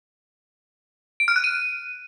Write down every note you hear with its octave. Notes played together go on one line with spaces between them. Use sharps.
D7
F6
F#6
D#7